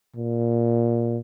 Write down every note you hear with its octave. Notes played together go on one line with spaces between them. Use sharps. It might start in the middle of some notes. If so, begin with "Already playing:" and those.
A#2